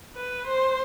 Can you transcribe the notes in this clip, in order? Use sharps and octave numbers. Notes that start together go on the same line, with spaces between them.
B4
C5